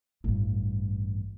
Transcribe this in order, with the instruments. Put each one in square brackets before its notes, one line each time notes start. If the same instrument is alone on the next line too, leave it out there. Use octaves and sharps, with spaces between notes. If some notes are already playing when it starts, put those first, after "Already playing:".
[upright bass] A1 G2